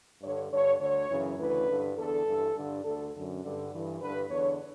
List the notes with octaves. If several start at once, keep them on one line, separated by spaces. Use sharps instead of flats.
G2 D3 C#5
G2 D3 C#5
D2 D3 C#5
F#2 C#3 E3
D2 C#3 E3 B4
G2 D3
E2 D3 A4
G2 E3
G2 D3
D2 D3 A4
F#2 D3
G2 D3
G2 E3
G2 D3 B4
E2 D3 C#5